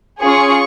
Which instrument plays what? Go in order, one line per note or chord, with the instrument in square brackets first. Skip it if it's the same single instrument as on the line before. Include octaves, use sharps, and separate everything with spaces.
[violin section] C#4 F4 G#4 C#6